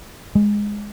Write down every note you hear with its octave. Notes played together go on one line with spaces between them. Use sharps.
G#3